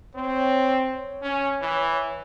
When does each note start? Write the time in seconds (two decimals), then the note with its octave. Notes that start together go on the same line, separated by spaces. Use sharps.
0.15 C4 C#5
0.77 C#5
1.22 C#4
1.62 E3